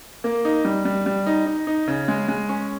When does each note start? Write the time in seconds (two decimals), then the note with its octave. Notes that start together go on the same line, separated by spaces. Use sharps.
0.24 A#3
0.45 D#4
0.65 G3
0.85 G3
1.06 G3
1.27 D#4
1.47 D#4
1.67 D#4
1.88 C#3
2.08 G#3
2.28 G#3
2.49 C#4